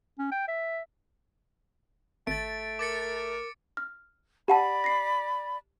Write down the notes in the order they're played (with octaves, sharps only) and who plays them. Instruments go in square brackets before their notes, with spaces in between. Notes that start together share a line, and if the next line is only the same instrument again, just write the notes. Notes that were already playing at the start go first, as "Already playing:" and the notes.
[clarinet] C#4
G5
E5
[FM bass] G#1 [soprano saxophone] A3 [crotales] A6 D7
[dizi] A#4 [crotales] D6 A6 C#7
[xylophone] F6
[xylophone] G4 F#5 A5 [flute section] D5 B5
[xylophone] A#6 C7